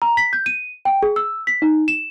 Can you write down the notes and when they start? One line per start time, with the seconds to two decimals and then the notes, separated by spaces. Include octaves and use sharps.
0.02 A#5
0.17 B6
0.33 G6
0.46 D#7
0.85 G5
1.03 G#4
1.16 E6
1.47 B6
1.62 D#4
1.88 E7